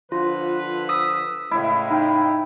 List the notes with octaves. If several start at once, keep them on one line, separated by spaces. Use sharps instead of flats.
D3 F3 F4 B4
D#6 E6 B6
A2 C#3 G#3 E4
D#4 G5